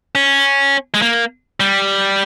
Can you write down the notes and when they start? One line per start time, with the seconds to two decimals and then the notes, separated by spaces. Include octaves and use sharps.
0.15 C#4
0.94 G#3
1.02 A#3
1.60 G3